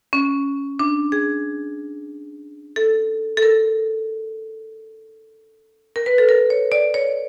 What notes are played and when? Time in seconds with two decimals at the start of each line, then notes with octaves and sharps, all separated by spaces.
0.13 C#4
0.79 D4
1.12 G#4
2.76 A4
3.37 A4
3.42 A#4
5.96 A#4
6.06 B4
6.18 A4
6.29 A#4
6.50 C#5
6.72 D5
6.94 C#5